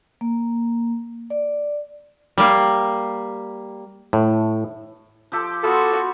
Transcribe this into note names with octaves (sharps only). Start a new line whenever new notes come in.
A#3
D5
G3 A#3
A2
F3 G4 A4
B3 F4 F#4 A4 C6